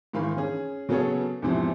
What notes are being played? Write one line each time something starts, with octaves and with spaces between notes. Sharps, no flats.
G#2 D#3 E3 F5 B5
C#4 G#4
C#3 F#3 B3 G#4 A4 C#5
E2 G#2 C3 E3 F3